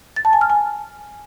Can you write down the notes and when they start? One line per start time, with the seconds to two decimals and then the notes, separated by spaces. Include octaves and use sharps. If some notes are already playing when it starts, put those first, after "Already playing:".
0.16 A6
0.25 A5
0.33 G#5
0.41 F6
0.50 G#5